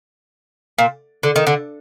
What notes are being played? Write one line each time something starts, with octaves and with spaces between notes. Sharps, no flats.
A#2
D3
D#3
D3